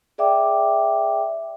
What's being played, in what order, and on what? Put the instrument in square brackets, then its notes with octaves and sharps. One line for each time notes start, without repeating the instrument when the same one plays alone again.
[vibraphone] G#4 D5 E5 G5 D6